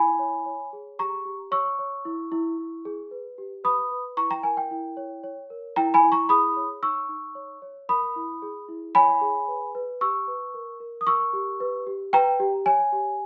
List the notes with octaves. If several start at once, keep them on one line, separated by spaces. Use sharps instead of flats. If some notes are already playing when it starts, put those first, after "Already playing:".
Already playing: E4 G#5 B5
C#5
C#5
G#4
G4 A#5 C#6
G4
C#5 C#6 E6
C#5
E4
E4
E4
G#4
B4
G4
B4 B5 D#6
B4
E4 A#5 C#6
G5 A#5
A#4 G#5
G5
E4
C#5
C#5
A#4
E4 G5 A#5
G#5 B5
E4
A#5 C#6
G#4 B5 D#6
C#5
D#4 C#6 E6
D#4
C#5
C#5
A#4 B5 D#6
E4
G#4
E4
C#5 G#5 B5
G#4
B4
B4
G4 C#6 E6
B4
A#4
A#4
D#6
A#4 C#6 E6
G4
B4
G4
B4 G5 A#5
G4
C#5 G#5
G4